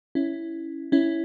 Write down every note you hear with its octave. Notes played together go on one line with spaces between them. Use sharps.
C#4 E4
C#4 E4